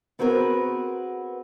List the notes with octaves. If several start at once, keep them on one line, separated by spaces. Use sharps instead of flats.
B3 C4 F#4 G#4 A#4 B4